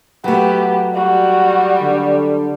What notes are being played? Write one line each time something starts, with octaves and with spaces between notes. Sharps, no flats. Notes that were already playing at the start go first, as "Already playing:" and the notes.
F#3 A3 B3 G4
G3 F#4
D3